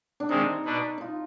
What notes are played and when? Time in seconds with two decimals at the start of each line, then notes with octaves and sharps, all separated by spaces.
0.20 D4
0.29 C3 D#3 G#3 C4 D#4
0.65 B2 B3 D4
0.98 D#4 F4